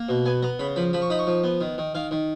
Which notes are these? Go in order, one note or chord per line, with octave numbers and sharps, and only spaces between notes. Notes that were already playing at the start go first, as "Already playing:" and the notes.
Already playing: A#3
B2
B3 G#5
B3 A#5
C#3 B5
F3 B5
F3 B5
C#6
D#4 B5
C#6
F3
B3
D#3
D#3
D#3 F5
D#3